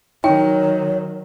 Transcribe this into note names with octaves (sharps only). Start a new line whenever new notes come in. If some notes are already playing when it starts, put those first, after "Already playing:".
D#3 F#3 D#4 C#5 G5